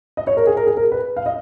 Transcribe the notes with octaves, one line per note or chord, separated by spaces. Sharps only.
D#5
C#5
A#4
G#4
A#4
G#4
A#4
B4
F5
D#5